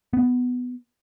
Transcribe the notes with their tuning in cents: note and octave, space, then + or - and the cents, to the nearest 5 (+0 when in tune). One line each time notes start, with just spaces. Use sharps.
B3 +5